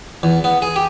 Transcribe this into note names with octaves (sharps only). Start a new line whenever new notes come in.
E2
B3
G#4
G4